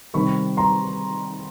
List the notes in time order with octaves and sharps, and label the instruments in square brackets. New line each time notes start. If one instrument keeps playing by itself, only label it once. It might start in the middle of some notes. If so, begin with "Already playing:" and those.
[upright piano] C3 D#3 G3 B5 C#6
A#5 C6